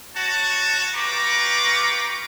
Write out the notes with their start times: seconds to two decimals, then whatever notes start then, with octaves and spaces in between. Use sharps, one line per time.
0.16 F#4 C#5 A5
0.95 F4 G4 B4 A#5 C#6 D6